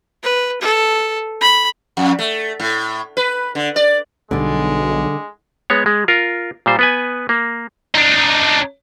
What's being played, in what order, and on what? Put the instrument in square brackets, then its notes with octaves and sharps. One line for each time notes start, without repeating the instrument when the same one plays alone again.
[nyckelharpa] B4
A4
B5
[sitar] F2
A3
A2
B4
D3
D5
[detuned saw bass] B1 [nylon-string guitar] D3 G3 [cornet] G#3
[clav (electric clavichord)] G#3 B3 C#5
G#3
F4 A#4
A#2 G3 C5
B3 B4 G#5
A#3
[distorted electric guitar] D4 D#4